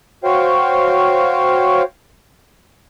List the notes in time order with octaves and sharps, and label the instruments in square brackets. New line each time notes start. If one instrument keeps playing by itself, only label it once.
[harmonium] F#4 C5 C#5 F5 G5